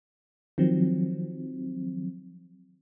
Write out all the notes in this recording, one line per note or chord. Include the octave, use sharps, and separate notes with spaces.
D#3 F3 F#3 C4